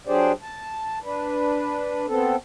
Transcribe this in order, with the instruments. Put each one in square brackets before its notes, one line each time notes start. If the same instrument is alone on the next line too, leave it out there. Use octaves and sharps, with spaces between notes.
[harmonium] F#3 D4 G4 G#4 C5 D5
A5
D4 B4
B3 C4 A4